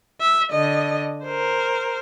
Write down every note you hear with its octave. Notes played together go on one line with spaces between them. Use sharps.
E5
D3 D#5
A#4 C5